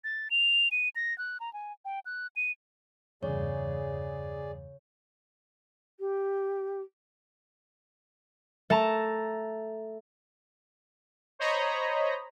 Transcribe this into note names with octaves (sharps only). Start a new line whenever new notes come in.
A6
F7
D#7
A#6
F#6
A#5
G#5
G5
F#6
D#7
E2 G2 C#3 G#4 C#5 D5
G4
A3 A5 A#5
C5 C#5 D#5 A#5 B5